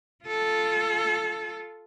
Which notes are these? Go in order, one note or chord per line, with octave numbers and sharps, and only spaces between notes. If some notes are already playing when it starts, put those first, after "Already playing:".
F4 A4